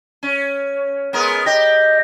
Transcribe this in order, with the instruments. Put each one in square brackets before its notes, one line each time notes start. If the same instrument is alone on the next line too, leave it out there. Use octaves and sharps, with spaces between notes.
[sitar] C#4
G#3 B3 A#4
[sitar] G4 [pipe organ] D#5